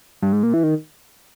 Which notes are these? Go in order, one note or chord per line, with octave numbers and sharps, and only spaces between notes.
G2
G#2
A#2
E3
D#3